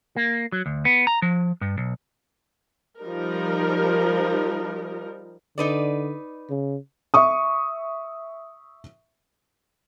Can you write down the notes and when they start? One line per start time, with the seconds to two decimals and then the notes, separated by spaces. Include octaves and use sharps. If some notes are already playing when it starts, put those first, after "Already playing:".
0.17 A#3
0.52 F#3
0.66 D2
0.85 B3
1.07 A#5
1.22 F3
1.61 G2
1.78 B1
3.01 F3 G3 D#4 A#4
5.58 D3 D#4 B4 D5
6.50 C#3
7.14 E5 C#6 D#6